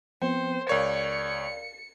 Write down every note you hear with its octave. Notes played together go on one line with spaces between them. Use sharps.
F3 B3 C4 C5 G5
C#2 A#4 C#5 D5 F5 C#7